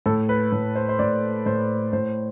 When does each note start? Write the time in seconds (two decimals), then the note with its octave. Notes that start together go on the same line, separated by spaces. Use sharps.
0.06 A2 A4
0.29 B4
0.52 A2
0.76 C5
0.89 C5
0.99 A2 D5
1.46 A2 C5
1.93 A2 C5